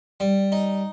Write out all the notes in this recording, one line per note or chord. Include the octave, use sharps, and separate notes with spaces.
G3
D#4